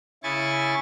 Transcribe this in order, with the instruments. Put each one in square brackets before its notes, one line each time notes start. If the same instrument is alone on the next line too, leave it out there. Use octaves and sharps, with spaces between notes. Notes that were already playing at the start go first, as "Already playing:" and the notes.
[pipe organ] C#3 E4 G#5 C#6 A6